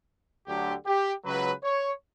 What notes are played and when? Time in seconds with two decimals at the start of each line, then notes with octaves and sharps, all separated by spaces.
0.47 D2 D3 F#3 G4
0.86 G4
1.25 C#2 C#3 F#3 B4
1.64 C#5